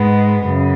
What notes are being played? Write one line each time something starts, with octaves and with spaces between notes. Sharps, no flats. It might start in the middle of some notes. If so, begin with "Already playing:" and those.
Already playing: G#2 G#3 B3
F#2 C#3